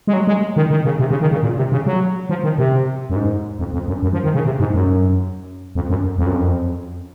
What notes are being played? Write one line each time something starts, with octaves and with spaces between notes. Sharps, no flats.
G#3
F#3
G#3
D#3
D#3
C#3
C3
C#3
D#3
C#3
A#2
C3
C#3
F#3
F3
D#3
C3
F#2
G#2
F2
F2
F#2
F#2
F3
D#3
C#3
C3
G#2
F#2
F2
F#2
F2
F#2
F2